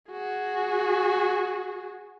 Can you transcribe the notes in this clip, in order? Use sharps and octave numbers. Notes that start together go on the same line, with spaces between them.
F#4 G#4